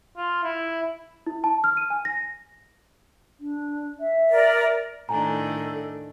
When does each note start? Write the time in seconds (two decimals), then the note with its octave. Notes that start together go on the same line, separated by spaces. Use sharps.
0.17 F4
0.43 E4
1.27 E4
1.44 A5
1.64 F6
1.77 D#7
1.90 G#5
2.05 A#6
3.40 D4
4.00 E5
4.29 A#4 D5
5.09 A2 D#3 D4 A4 G#5 A#5